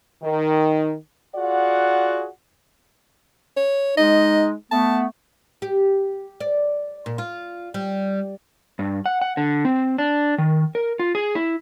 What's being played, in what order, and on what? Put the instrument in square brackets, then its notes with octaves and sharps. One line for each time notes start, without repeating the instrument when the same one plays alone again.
[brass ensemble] D#3
F4 F#4 G#4 D5 F#5
[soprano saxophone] C#5
[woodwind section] G#3 D#4 [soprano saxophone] D#5
[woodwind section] A3 B3 [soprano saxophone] A5
[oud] G4
D5
A#2
F4
G3
[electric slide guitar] G2
F#5
F#5
D3
C4
D4
D#3
A#4
F4
G#4
E4